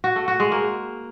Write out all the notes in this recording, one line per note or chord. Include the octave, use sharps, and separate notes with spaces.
F#4
A3
F#4
G#3
A#3